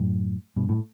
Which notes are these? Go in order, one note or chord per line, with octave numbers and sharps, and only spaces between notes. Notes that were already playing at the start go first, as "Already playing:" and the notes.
Already playing: F#2 A2
G2 B2
A2